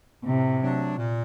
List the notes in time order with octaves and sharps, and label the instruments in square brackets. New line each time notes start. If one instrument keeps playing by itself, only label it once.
[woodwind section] A2 [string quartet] C3
[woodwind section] F#3 A3 D4 F#4
A#2